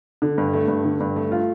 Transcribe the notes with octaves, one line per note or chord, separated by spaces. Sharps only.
D3
G2
A3
G2
D3
G2
A3
F4